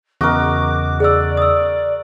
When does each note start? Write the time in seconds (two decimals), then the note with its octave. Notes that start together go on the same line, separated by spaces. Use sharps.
0.21 E2 C#3 F#4 A#4 D#5 D6
1.00 G#4 D5 E6
1.37 D#6 E6